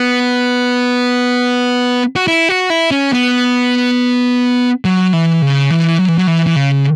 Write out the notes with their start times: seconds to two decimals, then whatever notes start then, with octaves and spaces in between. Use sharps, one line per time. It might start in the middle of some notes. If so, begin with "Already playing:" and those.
Already playing: B3
2.16 F#4
2.28 E4
2.49 F#4
2.70 E4
2.91 C#4
3.13 B3
4.85 F#3
5.13 E3
5.42 C#3
5.71 E3
5.99 F#3
6.08 E3
6.18 F#3
6.27 E3
6.47 E3
6.56 C#3